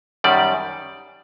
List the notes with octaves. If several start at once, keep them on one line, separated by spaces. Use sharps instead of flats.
F#2 D#3 G3 D5